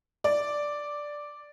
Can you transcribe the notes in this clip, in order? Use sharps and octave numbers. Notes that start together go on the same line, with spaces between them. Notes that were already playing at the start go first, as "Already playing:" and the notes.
D5